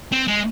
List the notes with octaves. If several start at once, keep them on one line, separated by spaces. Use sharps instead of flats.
C4
G#3